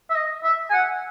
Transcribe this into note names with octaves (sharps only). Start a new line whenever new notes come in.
E5
D#5
E5
G#5
F#5